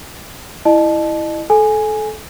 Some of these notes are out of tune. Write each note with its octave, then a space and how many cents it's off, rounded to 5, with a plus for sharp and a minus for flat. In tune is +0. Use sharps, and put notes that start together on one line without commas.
E4 +0 D#5 -35 A5 -25
A4 -25 G#5 +0